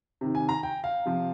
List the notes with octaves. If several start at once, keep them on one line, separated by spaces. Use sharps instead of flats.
C3 D#3
G#5
A#5
G5
F5
C3 F3